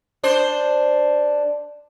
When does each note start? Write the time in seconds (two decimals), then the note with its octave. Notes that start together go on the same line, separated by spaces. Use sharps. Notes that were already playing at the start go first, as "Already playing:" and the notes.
0.23 D4 C5